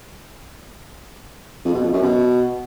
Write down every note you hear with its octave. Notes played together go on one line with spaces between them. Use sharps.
F2
B2
F2
F#2
B2